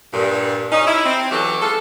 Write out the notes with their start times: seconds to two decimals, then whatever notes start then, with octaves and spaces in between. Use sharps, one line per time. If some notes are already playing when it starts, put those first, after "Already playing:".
0.13 G2 A#2
0.72 C#4 D#4
0.87 E4
1.06 C4
1.32 E3 F#3 C#4 G4 A4
1.62 G#3 F4 A4